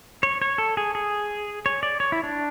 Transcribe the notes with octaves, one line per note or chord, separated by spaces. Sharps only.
C#5
C#5
A4
G#4
G#4
C#5
D5
C#5
E4
D4